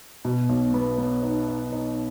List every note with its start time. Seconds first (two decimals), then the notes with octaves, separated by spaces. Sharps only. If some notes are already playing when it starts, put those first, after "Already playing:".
0.25 B2
0.49 B1
0.74 B3
0.98 B3
1.23 D#4
1.48 D#4
1.72 D#4